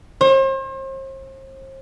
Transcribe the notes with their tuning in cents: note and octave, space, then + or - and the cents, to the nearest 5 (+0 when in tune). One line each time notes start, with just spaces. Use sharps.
C5 +40